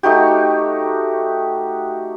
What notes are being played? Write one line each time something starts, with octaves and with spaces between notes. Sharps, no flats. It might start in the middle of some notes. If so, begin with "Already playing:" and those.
A3 D#4 F#4 G4